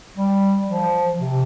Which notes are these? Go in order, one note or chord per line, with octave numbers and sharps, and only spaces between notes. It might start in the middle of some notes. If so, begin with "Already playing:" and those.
G3
F3
C3